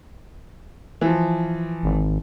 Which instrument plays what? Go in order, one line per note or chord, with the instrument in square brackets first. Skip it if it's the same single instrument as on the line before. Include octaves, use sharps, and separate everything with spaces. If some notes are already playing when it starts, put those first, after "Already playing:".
[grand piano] E3 F3
[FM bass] G#1